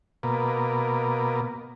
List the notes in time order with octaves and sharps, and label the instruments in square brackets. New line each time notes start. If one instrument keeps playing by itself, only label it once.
[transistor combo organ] B2 A#3